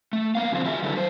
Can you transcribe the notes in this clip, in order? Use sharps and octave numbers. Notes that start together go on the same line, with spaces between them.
A3
A#3 B3 F5
C#3 F3 A#3 C4
F4 F#4 G#4 E5
D3 G3 A3 D4 E4 B4
F#3 C5